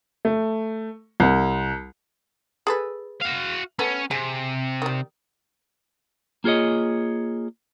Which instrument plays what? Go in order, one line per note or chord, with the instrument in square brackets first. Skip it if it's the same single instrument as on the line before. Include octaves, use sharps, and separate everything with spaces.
[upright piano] A3
C2
[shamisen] G#4 A4 B4
[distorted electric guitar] F#4 F5
[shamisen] A3 B3 [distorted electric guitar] C#4
[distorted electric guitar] C3 [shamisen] G#4
[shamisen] D#3 G3
[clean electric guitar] A#3 F4 G#4 C#5 D#5